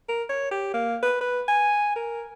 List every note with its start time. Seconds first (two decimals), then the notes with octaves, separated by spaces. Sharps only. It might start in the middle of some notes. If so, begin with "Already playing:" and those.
0.09 A#4
0.29 C#5
0.51 G4
0.74 A#3
1.03 B4
1.21 B4
1.48 G#5
1.96 A#4